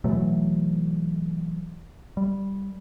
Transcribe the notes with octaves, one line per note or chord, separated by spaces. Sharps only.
B2 E3 F#3 A3
G3